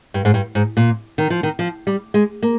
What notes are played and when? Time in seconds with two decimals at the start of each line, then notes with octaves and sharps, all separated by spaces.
0.14 G2
0.25 G#2
0.34 G2
0.55 G#2
0.77 A#2
1.18 D#3
1.30 F3
1.43 D#3
1.59 F3
1.87 G3
2.14 G#3
2.42 A#3